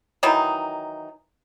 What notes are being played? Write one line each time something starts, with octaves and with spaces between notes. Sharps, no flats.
D#3 E3 F#3 D#4